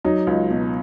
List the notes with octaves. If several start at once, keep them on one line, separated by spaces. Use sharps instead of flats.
F#3 D#4
C#2
B2